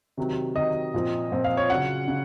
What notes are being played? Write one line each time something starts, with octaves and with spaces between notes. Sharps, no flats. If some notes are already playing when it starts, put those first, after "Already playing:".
C3 D#3 F#3
C3 D#3 F#3 D#5
A#2 F3 C4
A#2 F3 C4
F5
C#5
C#3 F#3 C#4 F#5
C#3